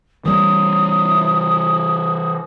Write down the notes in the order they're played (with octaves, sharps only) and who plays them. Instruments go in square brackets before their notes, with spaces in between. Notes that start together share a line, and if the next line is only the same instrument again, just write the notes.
[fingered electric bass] E3 G3 [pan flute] D#6